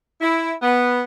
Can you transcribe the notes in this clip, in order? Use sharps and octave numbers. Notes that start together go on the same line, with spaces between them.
E4
B3